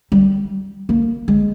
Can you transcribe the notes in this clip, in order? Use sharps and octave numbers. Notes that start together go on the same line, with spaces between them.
G3
A#3
G#3